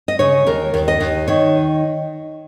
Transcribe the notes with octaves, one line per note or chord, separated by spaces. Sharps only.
D#5
C#3 C#5
D#2 A#4
D#2
D#5
D#2
D#3 C#5